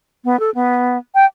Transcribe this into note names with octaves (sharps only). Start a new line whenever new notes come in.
B3
A4
B3
G5